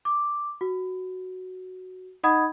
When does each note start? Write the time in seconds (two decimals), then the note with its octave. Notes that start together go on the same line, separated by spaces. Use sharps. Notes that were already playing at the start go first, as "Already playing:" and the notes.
0.05 D6
0.61 F#4
2.23 D#4 D#5 F#5 B5 D#6 G#6